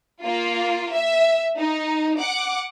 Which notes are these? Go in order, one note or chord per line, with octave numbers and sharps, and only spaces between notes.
A#3 F4
E5
D#4
F#5 D6